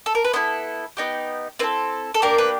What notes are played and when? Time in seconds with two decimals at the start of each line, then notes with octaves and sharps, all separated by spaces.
0.06 A4
0.15 A#4
0.24 B4
0.33 B3 E4 A4 C5
0.97 B3 D#4 G4
1.59 C4 E4 A4 B4
2.14 A4
2.22 A#3 D4 G4 A#4
2.38 B4